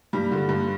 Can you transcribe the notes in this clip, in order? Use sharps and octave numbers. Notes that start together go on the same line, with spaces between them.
G2 G3
D3
G2